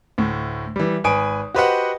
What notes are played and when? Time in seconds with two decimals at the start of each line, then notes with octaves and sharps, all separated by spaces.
0.18 D2 A2
0.76 E3 G3
1.04 G#1 B4 G#5 D#6 D7
1.54 F#4 G4 B4 C5 D#5 F#5